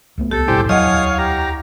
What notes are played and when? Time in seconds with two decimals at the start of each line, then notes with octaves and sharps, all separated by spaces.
0.18 C#2 A3 B3
0.31 C2 B3 G4 A4
0.48 A1 E2 G2 B2 G3 G4 C5
0.69 D2 F#3 C#5 D#5 F5 G#5 D#6
1.18 G4 A#5